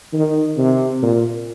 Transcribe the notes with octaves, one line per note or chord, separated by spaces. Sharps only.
D#3
C3
A#2